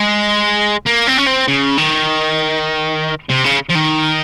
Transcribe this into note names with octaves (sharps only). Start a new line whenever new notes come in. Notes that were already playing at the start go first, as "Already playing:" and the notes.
Already playing: G#3
A#3
C4
C#4
C4
C#3
D#3
C3
C#3
F3
D#3